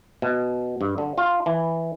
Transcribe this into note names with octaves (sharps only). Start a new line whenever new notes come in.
B2
G2
D3
F4
E3